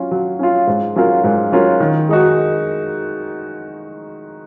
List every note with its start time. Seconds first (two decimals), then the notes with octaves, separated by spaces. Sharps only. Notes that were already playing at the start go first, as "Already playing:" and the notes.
Already playing: F#3 C#4 F4
0.11 F#3
0.39 C#4 F4
0.67 G#2
0.96 F#3 C#4 F4 A#4
1.24 G#2
1.52 F#3 C#4 F4 A#4
1.80 D#3
2.09 G#3 D#4 F#4